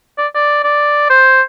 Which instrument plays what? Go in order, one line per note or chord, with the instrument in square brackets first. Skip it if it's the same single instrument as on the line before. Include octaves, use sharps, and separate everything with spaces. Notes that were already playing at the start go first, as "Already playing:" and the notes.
[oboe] D5
D5
D5
C5